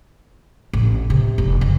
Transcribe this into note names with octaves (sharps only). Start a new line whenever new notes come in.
A1
C3
F1
F#1